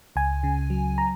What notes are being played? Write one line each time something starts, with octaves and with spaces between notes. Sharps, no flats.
C#2 G#5
C#3
F#3
A#5